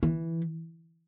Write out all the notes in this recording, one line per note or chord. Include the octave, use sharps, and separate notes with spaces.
E3